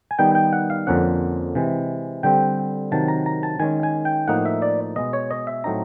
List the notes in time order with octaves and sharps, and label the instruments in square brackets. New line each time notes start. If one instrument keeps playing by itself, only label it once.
[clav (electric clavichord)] G#5
D#3 G3 B3 D#4 G5
G5
F#5
F5
F2 D3 F3 A#3 C#4 F#5
C3 E3 G#3
D3 G3 C4 G5
C3 D#3 F#3 A5
A#5
A#5
A5
D#3 G#3 C#4 G#5
G#5
G5
A2 F3 A#3 D#4 F#5
E5
D5
B2 G#3 B3 D#5
C#5
D#5
E5
A2 F#3 A3 C4 D#4 A#5